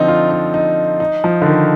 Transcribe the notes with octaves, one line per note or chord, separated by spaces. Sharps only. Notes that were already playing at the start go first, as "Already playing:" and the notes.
Already playing: D3 F3 C4 D#4
F4
D#4
D#4
D#4
F3
D3
D#3